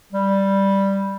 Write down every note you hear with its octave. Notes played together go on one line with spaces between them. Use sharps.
G3